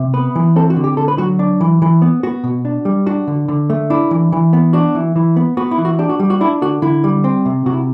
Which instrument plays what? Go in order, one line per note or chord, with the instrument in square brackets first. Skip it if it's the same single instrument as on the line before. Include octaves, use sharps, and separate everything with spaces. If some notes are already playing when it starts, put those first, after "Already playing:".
Already playing: [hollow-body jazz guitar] C3
B3 B4
E3
C4 A4
F#4
D3
G4
D3 A4
B4
F#3 F#4
D4
E3
E3
B3
B3 F#4
B2
D4
G3
D4 F#4
D3
D3
A3
D4 E4
E3
E3
B3
D4 F#4
E3
E3
B3
B3 F#4
E4
E3
F#4
D4 G4
F#4
G3
F#4
D4 E4
D3 F#4
D3 E4
G3
C4
C3
C3 F#4
E4